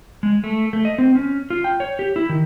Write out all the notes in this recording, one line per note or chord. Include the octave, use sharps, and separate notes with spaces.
G#3
A3
A3
D#5
C4
C#4
F4
G5
C#5
G4
E4
D#3